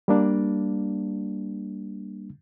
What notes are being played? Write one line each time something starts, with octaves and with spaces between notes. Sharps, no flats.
G3 A#3 D4